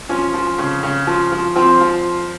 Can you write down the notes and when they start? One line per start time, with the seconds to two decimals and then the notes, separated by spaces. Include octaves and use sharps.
0.09 F3 C#4
0.34 F3
0.58 C#3
0.83 C#3
1.07 F3
1.32 F3
1.56 F3 C4
1.81 F3